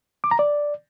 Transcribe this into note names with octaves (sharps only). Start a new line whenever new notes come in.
D6
A#5
D5